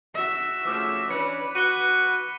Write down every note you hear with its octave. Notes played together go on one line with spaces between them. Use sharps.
F#4 E5
C#3 F3 A3 D6
E3 C#4 D4 B4 C#7
F#4 D#7 G7